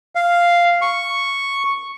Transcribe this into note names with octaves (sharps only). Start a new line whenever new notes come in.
F5
C#6